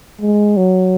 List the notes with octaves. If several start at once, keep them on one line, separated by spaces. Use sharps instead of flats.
G#3
F#3